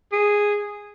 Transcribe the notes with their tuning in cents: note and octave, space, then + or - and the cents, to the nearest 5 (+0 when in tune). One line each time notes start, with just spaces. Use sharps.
G#4 -10